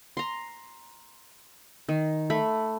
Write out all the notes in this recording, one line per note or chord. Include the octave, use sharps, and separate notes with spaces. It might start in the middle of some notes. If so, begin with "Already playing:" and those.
A#5 C6
D#3
A3 B5